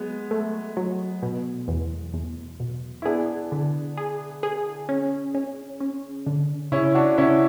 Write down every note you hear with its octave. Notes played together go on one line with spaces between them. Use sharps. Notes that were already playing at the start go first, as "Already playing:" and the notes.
Already playing: F#3 G#3 B3
A3
F#3
B2
E2
E2
B2
E4
B3 D4 G#4
D3
G#4
G#4
C#4
C#4
C#4
D3
C#3 C#4 E4
D4 F#4
C#3 C#4 E4